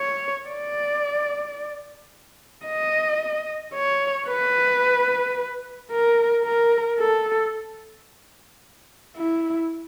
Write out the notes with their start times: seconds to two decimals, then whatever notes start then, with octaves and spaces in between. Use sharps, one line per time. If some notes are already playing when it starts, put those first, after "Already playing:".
Already playing: C#5
0.48 D5
2.65 D#5
3.74 C#5
4.28 B4
5.91 A#4
6.44 A#4
6.98 A4
9.16 E4